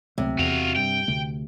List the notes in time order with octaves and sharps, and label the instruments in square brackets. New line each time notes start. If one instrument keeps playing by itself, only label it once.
[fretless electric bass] C#2 F#3 A3 [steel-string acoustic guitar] C3
[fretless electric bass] E2 [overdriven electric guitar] F#4 F5
[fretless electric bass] G2 [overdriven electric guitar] G5
[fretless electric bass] D2 C3 A3